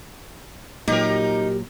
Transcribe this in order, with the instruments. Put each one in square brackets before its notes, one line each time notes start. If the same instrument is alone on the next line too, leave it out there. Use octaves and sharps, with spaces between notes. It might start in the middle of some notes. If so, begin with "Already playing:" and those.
[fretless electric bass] A#2 F#3 [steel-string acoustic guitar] D#4 [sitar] G4 A#4